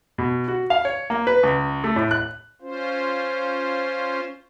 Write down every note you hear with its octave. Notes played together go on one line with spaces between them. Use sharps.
B2
F#4
F5
C#5
A#3
B4
C#2
A3
A2
F#6
C#4 F4 C5